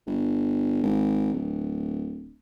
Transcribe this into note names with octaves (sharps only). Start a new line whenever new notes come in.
G1
G#1
D1